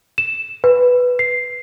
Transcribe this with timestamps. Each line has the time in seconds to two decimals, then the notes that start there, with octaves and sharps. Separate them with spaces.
0.18 E7
0.64 B4
1.19 C7